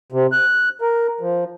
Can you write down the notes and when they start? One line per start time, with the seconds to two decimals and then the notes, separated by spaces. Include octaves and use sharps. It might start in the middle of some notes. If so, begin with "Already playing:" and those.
0.12 C3
0.32 F#6
0.81 A#4
1.21 F3